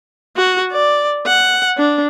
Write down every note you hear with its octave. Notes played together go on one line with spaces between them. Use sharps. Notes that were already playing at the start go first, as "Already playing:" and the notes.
F#4
D5
F#5
D4